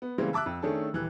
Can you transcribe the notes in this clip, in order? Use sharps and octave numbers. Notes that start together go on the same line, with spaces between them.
B3
C#3 E3 G3 G#3 A#3 C4
E5 A5 D6 E6 F#6
F2
D#3 A3 C#4 D4 G#4 A4
D#1 E3 F#6